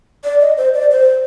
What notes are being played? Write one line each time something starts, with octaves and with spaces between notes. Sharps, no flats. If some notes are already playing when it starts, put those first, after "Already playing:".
D5
D#5
C5
D5
C5